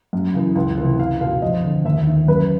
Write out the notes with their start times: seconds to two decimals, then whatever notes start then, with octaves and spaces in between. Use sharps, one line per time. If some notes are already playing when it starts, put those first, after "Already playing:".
0.13 F#2
0.34 C#3 E3
0.55 C#2
0.78 C3 E3
0.98 C#2 F5
1.21 B2 F5
1.42 F2 D#5
1.64 D3
1.85 D#2 E5
2.07 D#3
2.28 F#2 B4